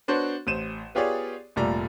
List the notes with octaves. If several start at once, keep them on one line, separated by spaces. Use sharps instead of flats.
B3 D4 F#4 C5 C#5
A1 C5 D#7 E7
B3 F4 G4 G#4 C#5 D5
F1 A#2 G3 A3 D5 A#5